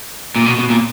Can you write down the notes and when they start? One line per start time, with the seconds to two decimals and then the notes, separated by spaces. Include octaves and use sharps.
0.36 A#2
0.46 B2
0.59 B2
0.70 A#2